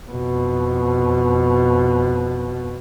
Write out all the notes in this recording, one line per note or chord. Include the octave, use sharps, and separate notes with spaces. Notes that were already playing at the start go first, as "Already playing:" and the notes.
F2 B2